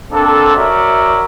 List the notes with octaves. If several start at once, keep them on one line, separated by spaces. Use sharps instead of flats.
A#3 C4 D4 A4
F#4 A#4 C#5 D5 E5